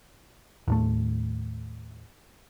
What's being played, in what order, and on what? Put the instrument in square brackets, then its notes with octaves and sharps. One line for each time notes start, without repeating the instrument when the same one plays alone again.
[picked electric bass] D#2 A2 A3